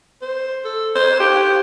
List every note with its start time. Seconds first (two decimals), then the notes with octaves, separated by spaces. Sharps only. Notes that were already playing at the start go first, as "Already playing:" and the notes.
0.22 C5
0.65 A4
0.95 C5
1.19 G4